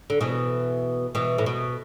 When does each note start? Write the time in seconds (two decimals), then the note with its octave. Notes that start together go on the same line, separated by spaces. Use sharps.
0.10 D3
0.21 B2 E3
1.15 B2 E3
1.38 A2
1.46 B2